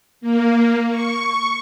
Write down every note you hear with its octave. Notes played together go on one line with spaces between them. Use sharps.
A#3
C#6